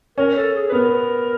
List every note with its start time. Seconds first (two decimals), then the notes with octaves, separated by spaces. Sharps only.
0.18 C#4 A#4
0.36 A4
0.55 G#4
0.68 B4
0.72 B3 A#4